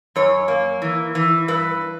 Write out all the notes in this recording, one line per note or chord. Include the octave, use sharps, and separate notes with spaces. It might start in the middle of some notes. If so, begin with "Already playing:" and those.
F#2 C#5
A#3
E3
E3
G2 B4